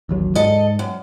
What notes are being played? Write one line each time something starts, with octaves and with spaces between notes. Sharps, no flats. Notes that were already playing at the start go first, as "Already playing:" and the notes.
A1 D#2 F#3
G#2 A4 D#5
F#2